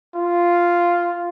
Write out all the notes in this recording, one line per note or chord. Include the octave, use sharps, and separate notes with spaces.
F4